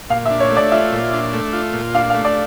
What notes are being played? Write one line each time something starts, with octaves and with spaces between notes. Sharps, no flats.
A#2 F5
E5
D4
C#5
A3
D5
F4 E5
A#2
D4
A3
F4
A#2
D4 F5
F5
A3
D5